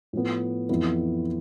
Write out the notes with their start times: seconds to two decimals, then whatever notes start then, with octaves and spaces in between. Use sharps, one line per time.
0.13 A2 F3 B3
0.69 F2 E3 B3 E4